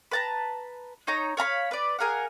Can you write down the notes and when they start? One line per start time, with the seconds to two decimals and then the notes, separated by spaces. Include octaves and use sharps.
0.11 B4 A5 A#5
1.07 D#4 C#5 A#5
1.37 C#5 F5 A#5 B5
1.71 B4 D5
1.99 G#4 A#4 F5 F#5